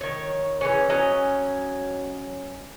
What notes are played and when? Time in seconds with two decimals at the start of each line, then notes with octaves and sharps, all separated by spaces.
0.01 D#3 C#5
0.61 E3 G#3 C#4
0.89 F#3 C#4 D#5